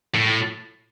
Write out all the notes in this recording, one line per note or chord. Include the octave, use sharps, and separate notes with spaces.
A2